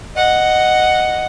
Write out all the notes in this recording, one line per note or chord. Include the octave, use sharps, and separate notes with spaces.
D#5 F#5